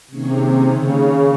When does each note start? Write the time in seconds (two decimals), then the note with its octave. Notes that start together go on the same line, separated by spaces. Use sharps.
0.10 C3 D#3 A#3 C#4 G#4 C#5
0.70 C#3